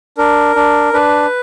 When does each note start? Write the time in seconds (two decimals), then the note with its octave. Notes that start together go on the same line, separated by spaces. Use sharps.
0.18 D4 A#4
0.56 D4
0.93 D4 B4